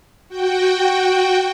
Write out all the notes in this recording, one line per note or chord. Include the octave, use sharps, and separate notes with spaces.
F#4 G5